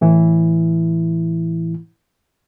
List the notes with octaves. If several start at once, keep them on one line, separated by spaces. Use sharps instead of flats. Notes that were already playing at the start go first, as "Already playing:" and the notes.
A2 E3 E4